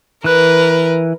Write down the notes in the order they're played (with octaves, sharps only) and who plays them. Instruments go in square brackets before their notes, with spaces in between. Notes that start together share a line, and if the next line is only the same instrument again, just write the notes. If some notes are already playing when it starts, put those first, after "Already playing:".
[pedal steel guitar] E3 F#6 [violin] A#4 B4